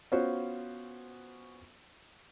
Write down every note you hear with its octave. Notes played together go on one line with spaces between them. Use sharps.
B3 C#4 F4 F#4 C5